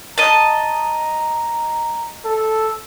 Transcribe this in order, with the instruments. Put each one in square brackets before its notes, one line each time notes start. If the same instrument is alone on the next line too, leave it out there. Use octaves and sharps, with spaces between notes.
[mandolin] D#5 A5 [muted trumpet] A#5
[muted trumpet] A4